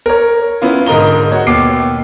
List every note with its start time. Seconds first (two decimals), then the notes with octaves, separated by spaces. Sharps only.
0.06 A#4 C#5
0.62 B3 C#4 E4 F4
0.86 G#2 D3 A#4 D#5 A#5 G7
1.32 F#4 C#5
1.47 D#2 B2 D6 C7